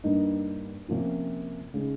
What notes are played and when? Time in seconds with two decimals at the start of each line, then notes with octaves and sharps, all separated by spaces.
0.04 G2 G3 A#3 D#4
0.88 C3 F3 A#3 C#4 F4
1.74 C#3 G#3 D#4